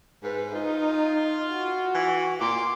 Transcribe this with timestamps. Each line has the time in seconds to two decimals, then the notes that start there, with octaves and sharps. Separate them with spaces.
0.23 G#2 B4
0.55 D#4 F4
1.51 F#4
1.95 E3
2.41 A#2 C6 D6